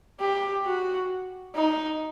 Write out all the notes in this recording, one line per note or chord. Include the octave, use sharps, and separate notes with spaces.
G4
F#4
D#4